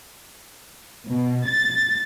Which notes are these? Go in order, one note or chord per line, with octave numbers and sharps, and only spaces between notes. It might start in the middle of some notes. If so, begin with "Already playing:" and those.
B2
A6